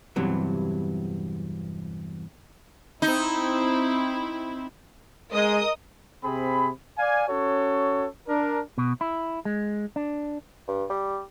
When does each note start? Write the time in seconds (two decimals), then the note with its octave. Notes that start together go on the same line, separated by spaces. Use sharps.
0.16 E2 G2 C3 E3 F#3
3.02 C4 D#4 E4
5.32 G#3 A#4 D#5 D#6
6.24 C3 C4 G#4 B5
6.98 D5 F5 G#5
7.29 C#4 F#4 A4 C#5
8.28 D4 A#4
8.78 B2
9.01 E4
9.45 G#3
9.96 D4
10.68 G2
10.90 G3